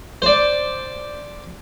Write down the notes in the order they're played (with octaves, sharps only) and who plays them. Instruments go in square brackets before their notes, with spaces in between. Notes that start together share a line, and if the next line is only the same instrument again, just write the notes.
[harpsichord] C5 D5